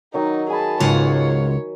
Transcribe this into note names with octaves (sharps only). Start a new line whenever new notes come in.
D#3 F#3 D#4
G#4 G#5 A5 B5
C#2 G#2 F4 C#5 F#5